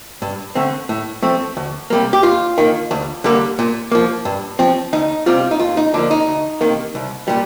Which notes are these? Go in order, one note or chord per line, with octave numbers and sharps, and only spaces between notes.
G2
D3 A3 C4
A2
F3 A3 C4
D2
C3 G3 A#3
G4
D#2 F4
D#3 A#3
D2
D3 G3 A#3
A#2
F3 A#3
G2
F3 C4
D2 D#4
C3 G3 C4 F4
D#4
D#2 F4
D#4
D3 F3 A#3 D4
D#4
D2
C3 D#3 A#3
C2
A#2 G3